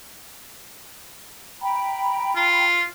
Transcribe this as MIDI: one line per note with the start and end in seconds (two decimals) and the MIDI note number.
1.61 2.64 79
1.61 2.64 82
1.61 2.64 83
2.36 2.83 65